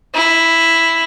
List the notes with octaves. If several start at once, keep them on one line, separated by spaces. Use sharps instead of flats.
E4